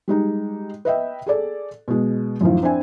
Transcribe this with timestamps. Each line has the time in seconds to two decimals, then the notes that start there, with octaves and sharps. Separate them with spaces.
0.08 G3 G#3 D#4
0.85 B4 D#5 E5 G5
1.26 G#4 A4 D5
1.88 B2 G#3
2.41 F#2 A2 D#3 F3
2.63 C4 D4 E4 E5 G#5